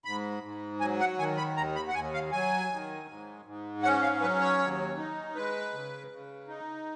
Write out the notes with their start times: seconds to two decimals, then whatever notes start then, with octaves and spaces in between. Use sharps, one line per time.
0.05 G#2 B5
0.43 G#2
0.80 F#3 G#5
0.99 F#5
1.19 D#3 G#5
1.37 B5
1.56 D#2 A#5
1.76 B5
1.88 F#5
1.94 D#2 G#5
2.14 F5
2.32 F#3 G#5
2.70 D#3
3.08 G#2
3.45 G#2
3.83 C#4 F#5
4.02 F5
4.21 F#3 B4
4.40 C#5
4.58 D#2
4.97 D#4
5.35 G#3 B4
5.73 C#3
6.11 C#3
6.48 D#4